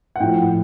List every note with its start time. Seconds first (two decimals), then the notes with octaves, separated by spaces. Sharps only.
0.16 F#5
0.20 A2 G5
0.23 F3